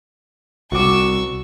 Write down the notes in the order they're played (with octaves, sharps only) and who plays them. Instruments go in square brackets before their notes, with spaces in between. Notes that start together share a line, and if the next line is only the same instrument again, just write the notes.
[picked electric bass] C2 [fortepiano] F#4 D6 [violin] C#6 E6